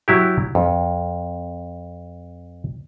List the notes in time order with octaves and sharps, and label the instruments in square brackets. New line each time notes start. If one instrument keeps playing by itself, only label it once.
[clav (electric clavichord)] F#3 E4 G4
F2